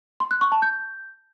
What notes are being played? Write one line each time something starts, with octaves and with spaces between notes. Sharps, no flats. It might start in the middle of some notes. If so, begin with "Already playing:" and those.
C6
F#6
C#6
A5
G6